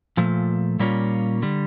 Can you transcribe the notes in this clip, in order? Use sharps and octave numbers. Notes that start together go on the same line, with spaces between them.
A#2 F3 A3
A#2 G3 A#3 C#4 F4
D3 G3